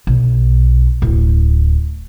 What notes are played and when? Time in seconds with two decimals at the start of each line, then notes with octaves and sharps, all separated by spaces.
0.07 B1
1.02 D1